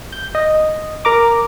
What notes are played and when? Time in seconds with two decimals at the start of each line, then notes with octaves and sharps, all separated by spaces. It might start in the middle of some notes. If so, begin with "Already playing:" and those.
0.12 G6
0.35 D#5
1.05 A#4 A#5 D6